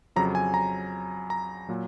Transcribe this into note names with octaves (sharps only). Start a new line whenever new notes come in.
F2 C#3 F#3 A#5
G#5
A#5
A#5
A#2 F#3